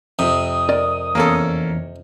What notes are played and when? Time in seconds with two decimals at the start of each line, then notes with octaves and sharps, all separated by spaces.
0.19 F2 C3 D#6
0.69 A#4 D5 D#5
1.15 E2 A#3 C#4 A4